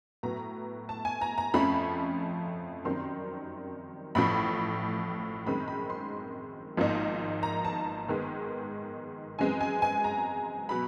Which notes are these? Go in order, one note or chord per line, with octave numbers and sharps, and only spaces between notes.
A2 F#3 B3 A#5
A5
G#5
A#5
A#5
F2 C#3 F3 A3 C#4 B5
F#2 D#3 G3 C4 C6
A1 A2 F3 B5
F#2 D#3 G#3 C4 B5
B5
C6
G#1 G#2 F3 A#3 D#4
A#5
A5
G#2 D#3 G#3 B3
F#2 C#3 E3 G#3 C4 G#5
G#5
G#5
A#5
B2 F#3 B5